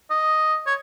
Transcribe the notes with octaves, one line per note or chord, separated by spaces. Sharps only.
D#5
C#5